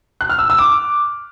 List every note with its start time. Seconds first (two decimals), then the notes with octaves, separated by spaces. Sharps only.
0.21 F#6
0.30 F6
0.39 E6
0.50 E6
0.59 D6